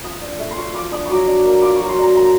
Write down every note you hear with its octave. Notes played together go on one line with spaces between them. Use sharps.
F3 D#6
D4
A3
C6
F4 C#6
F3 D6
D4 D#6
F#3 C#6 D6
D4
A#3
F4 D6
F#3 C#6
C6
D4 A#5
A#3 A#5